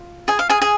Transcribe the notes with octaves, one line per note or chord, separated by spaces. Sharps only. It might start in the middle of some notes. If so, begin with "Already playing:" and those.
Already playing: F4
G#4 G#5
F5
G#4 G#5
G#4 G#5